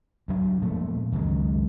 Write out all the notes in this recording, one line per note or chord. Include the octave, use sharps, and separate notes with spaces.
D2 F#3 D4
E1 A#2 F3 A3
C#2 F#2 D#3 G#3